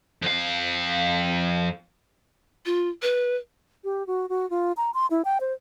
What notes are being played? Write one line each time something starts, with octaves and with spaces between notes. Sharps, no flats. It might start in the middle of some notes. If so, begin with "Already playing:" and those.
F2 F5
F4
B4
G4
F#4
F#4
F4
A#5
C6
E4
G5
C5